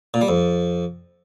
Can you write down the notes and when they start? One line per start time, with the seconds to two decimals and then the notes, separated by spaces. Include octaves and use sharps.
0.14 A#2
0.21 G3
0.28 F2